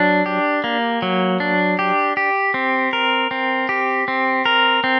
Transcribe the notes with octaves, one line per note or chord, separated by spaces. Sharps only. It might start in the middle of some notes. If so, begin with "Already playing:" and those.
Already playing: F#3 D4
G4
A#3
F#3
D4
G4
G4
C4
A#4
C4
G4
C4
A#4
C4